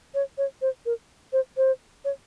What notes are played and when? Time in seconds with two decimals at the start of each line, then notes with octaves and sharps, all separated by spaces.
0.14 C#5
0.38 C#5
0.61 C5
0.86 A#4
1.32 C5
1.57 C5
2.05 C#5